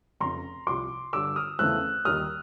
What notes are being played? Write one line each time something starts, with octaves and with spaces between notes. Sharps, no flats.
F1 F2 C#3 A#5 C6
C2 C3 F3 C6 D6
G2 D3 G3 D6 E6
D#6 F6
E2 C#3 E3 A3 C4 E6 F#6
D#2 D#3 G3 D#6 F6